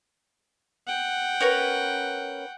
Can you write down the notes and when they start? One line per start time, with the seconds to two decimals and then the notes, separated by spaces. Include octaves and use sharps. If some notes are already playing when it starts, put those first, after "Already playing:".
0.87 F#5 G5
1.41 C#4 A#4 B4